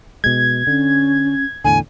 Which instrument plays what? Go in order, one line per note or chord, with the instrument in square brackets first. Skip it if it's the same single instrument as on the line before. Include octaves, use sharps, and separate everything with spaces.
[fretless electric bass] B2 G#3 [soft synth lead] G#6
[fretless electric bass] D3 [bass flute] C#4
[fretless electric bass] E2 A2 D3 [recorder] G#5